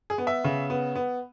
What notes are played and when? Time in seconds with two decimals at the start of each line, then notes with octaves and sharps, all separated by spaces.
0.10 G#4
0.18 B3
0.27 E5
0.44 C#3
0.70 B3
0.96 B3